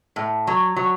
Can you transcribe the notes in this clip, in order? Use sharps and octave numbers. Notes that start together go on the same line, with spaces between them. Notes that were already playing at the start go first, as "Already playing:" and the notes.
A2
F#3
F#3